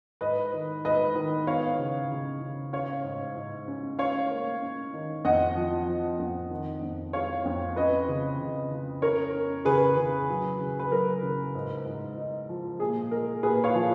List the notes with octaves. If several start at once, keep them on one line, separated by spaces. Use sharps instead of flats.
G#2 B4 D#5
D#3
G#2 B4 D#5
D#3
B3 C#5 F5
C#3
C#3
C#3
C#4 C#5 F5
G#2
G#2
C#4
C#4 C#5 F5
A#3
C#4
D#3
F2 D#5 F#5
F3
F3
F2
D#3
F2
G#3 C#5 F5
F2
C#4 B4 D#5
C#3
C#3
C#3
C#4 A#4 C#5
C#4
C#3 G#4 B4
C#3
F#3
C#3
B4
F#3 A#4
C#3
G#2
G#2
D#4
F3
A#2 G#4
G#3 A#4
A#2 G#4 B4
C#5 F5
F3